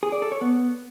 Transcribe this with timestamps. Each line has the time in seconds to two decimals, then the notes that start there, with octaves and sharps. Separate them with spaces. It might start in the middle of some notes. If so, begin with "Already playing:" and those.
0.03 G#4
0.12 D5
0.22 A4
0.32 C#5
0.41 B3